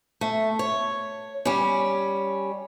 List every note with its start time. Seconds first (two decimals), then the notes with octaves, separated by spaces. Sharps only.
0.21 A3
0.59 C#5
1.45 G3 C#4